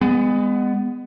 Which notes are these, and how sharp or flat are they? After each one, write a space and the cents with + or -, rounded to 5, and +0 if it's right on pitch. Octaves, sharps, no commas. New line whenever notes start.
G#3 -30 B3 +20